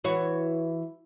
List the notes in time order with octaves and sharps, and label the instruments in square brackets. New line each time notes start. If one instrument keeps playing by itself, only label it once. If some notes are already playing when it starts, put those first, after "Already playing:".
[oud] E3 F#4 C#5